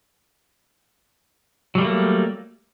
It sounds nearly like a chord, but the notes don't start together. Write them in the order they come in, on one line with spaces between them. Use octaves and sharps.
F#3 G3 A3 A#3